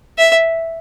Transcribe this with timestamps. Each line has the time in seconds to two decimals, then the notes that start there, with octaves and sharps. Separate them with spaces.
0.18 E5